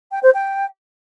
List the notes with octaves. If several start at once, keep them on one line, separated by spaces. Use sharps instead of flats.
G5
C5
G5